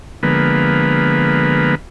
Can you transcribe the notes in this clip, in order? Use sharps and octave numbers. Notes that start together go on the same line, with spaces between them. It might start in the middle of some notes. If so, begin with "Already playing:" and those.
D3 F3 G#3 A#3 B3 B4